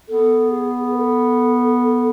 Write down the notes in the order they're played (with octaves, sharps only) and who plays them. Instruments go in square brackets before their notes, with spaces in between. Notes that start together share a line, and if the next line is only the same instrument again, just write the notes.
[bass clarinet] B3 [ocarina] A4
[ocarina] G#4
G#4
B4
A4